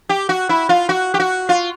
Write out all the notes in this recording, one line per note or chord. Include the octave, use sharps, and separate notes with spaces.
G4
F#4
E4
F4
F#4
G4
F#4
F4